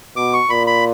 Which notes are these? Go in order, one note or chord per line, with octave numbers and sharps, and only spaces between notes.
B2 D6
C#6
A#2 B5
B5